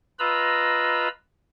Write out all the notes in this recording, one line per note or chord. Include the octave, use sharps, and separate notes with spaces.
F4 B4 D#5 A#5 B5 E6